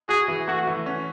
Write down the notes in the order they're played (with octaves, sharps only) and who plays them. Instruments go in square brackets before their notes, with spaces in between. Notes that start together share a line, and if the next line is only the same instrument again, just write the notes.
[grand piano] F#4 [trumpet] G#4
[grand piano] E3
[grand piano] A3 [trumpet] F#4
[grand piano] E3
C#4